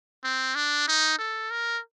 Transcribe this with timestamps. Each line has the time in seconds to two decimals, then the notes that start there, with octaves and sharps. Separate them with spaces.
0.24 C4
0.55 D4
0.88 D#4
1.19 A4
1.51 A#4